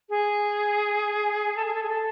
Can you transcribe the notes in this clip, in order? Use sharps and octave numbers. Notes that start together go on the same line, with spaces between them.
G#4
A4
G#4
A4
G#4
A4